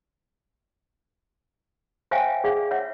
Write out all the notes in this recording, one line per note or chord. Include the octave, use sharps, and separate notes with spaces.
C5 C#5 E5 F5 G5 G#5
G#4 D5 F5 F#5
C#5 E5 F#5